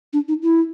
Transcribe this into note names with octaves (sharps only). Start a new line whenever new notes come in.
D4
D#4
E4